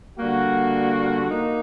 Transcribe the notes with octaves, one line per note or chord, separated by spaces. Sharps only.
D3 G3 A#3 F#4
A#3 D#4